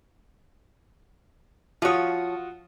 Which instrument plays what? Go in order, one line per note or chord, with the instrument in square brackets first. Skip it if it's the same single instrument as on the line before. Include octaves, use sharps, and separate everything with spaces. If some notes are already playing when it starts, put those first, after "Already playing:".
[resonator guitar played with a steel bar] F3 C#5 [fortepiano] F4 F#4 D#6